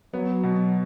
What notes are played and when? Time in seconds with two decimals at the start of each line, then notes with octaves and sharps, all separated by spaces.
0.13 F#3 B3
0.43 B2